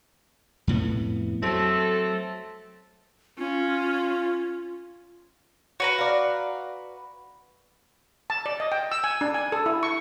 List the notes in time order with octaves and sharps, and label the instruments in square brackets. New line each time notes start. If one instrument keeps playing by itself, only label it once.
[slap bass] F2 A2 B3
[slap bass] F#3 [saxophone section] A3 C4 A4
[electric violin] C#4 [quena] F4
[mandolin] F#4 B4 A#5 [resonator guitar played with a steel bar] C#5
[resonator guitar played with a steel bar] D5 F5
[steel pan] A5
D5
D#5
G5
E6
G#5
D4
G#5
A4
E4
C#6